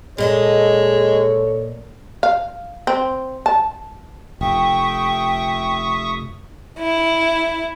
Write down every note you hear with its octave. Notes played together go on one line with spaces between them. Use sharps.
A#2 G#3 A4 C#5 D#5 A5
F5
C4
A5
F1 E5 G5 C#6 D#6
E4